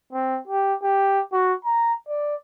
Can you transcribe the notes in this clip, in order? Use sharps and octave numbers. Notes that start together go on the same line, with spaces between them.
C4
G4
G4
F#4
A#5
D5